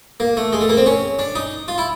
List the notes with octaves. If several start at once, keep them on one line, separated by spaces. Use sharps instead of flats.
A#3
A3
G#3
A3
A#3
C4
C#4
D4
D#4
F4
E4